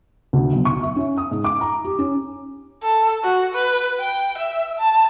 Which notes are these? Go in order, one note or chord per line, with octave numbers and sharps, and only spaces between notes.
D2
B1
C#6
E5
C#4
D#6
G#2
D6
A#5
G4
C#4
A4
F#4
B4
G5
E5
A5